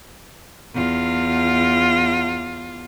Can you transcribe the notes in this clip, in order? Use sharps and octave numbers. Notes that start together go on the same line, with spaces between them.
E2 F4